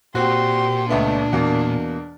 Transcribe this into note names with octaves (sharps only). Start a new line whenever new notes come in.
A#2 C4 F#4 G4 C6
C#2 A3 B3 D4
E2 B2 A#3